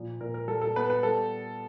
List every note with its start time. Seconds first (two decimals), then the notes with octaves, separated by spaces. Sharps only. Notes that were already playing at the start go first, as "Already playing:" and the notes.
Already playing: A#2 F3
0.20 A#2 A#4
0.34 A#4
0.48 G3 A4
0.61 A4
0.76 B3 B4
0.90 B4
1.03 G3 A4